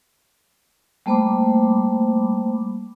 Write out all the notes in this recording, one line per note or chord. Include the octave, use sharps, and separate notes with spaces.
G3 A3 A#3 C5 B5 D6